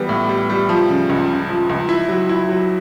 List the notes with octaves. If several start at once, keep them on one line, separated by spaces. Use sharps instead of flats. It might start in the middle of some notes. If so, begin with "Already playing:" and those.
Already playing: E3 G3 B3
A2
G3
G3
F3
C#3
C#2
C#3
F3
C#2
E4
F#3
E4
F#3